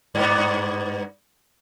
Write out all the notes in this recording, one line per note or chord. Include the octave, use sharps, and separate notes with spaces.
G2 B3